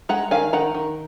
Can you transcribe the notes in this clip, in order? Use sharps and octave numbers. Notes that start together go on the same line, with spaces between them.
G#3 F#5 A#5
D#3 F5 G#5
D#3 F#5 A#5
D#3